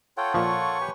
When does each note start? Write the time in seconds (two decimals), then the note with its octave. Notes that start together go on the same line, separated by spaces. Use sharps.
0.17 F4 A4 C#5 F#5 G5
0.34 A#2 F3 C#5 C#6
0.81 G4 B4 G#5